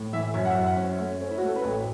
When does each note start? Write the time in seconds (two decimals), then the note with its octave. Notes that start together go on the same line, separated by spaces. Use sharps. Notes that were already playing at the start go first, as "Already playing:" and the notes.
Already playing: A2
0.13 E3 E5
0.34 F#2 C#5
0.45 F#5
0.50 E5
0.56 F#2
0.66 F#5
0.77 C#4
0.83 E5
0.99 A3 C#5
1.21 C#4
1.31 E4
1.38 F#4
1.42 A3 A4
1.56 B4
1.64 A1 C#5